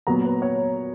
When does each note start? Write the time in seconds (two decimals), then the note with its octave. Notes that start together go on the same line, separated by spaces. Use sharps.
0.07 A#2 F#3 B3 A#5
0.25 B4
0.42 C#5